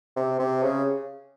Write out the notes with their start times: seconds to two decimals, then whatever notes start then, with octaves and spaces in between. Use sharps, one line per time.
0.16 C3
0.39 C3
0.62 C#3